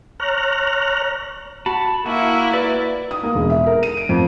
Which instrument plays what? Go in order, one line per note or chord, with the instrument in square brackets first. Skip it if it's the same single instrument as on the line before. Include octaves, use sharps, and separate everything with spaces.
[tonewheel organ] C#5 A#5 F6 F#6
[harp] F#4 [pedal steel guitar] A5 B5
[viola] A#3 E4 [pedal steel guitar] F#4 [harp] G#5
[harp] B4 [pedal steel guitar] D5
[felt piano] D#6
A#3
E1
E5
A#4
D#7
D7
F2